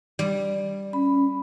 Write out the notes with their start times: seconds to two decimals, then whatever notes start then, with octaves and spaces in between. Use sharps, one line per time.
0.19 G3
0.93 C#4 B5